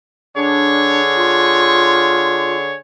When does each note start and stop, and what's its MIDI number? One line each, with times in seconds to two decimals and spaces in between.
0.36 2.76 50
0.36 1.00 62
0.36 2.76 68
0.36 2.76 73
1.16 2.56 65